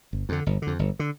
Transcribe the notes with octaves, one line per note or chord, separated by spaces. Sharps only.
G1
F2 D3
G1
F2 D3
G1
D3